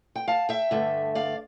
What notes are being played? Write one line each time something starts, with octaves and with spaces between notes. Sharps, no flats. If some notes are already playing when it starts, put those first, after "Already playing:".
G5
F5 A5
E5 G5
G2 D3 A3
D5 F5